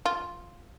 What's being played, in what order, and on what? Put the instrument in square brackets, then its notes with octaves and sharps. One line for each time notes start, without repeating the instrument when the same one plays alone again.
[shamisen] F4